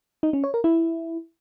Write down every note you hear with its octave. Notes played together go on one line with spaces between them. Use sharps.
D#4
C#4
C#5
A#4
E4